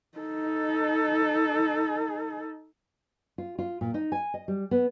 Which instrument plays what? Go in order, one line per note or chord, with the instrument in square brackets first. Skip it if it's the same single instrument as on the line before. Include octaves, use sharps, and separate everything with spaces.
[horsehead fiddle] D#4 A4
[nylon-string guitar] F4
F4
A#2
D#4
G#5
D#5
G3
B3